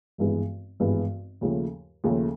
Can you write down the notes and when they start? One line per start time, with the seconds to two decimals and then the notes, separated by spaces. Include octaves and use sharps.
0.18 G#1 G2 E3 G#3 B3
0.80 G#1 G2 E3 G#3 B3
1.41 D#2 C#3 F3 A3
2.04 D#2 C#3 F3 A3